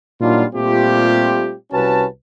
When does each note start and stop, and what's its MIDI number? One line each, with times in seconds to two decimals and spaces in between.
0.21 0.45 46
0.21 0.45 54
0.21 0.45 55
0.21 0.45 62
0.21 0.45 63
0.21 0.45 65
0.55 1.54 46
0.55 1.54 55
0.55 1.54 57
0.55 1.54 60
0.55 1.54 65
0.55 1.54 67
1.72 2.06 36
1.72 2.06 48
1.72 2.06 61
1.72 2.06 66
1.72 2.06 71
1.72 2.06 81